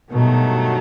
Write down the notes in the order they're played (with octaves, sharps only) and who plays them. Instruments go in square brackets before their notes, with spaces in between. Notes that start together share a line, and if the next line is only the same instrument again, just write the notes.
[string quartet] G2 D#3 F#3 A3 [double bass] B2